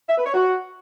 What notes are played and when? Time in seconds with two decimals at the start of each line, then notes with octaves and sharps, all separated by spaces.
0.08 E5
0.17 B4
0.26 C#5
0.34 F#4